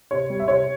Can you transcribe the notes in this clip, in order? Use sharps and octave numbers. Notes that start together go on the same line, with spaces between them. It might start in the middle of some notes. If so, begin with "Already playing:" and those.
C3 C#5
G3
E5
C3 C#5